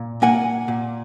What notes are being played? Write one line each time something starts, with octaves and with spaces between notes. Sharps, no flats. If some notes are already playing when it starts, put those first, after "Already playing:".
Already playing: A#2
A#3 F#5 G#5
A#2